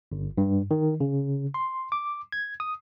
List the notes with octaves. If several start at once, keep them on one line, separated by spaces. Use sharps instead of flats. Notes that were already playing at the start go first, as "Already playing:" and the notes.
G1
G2
D#3
C#3
C6
D6
G#6
D#6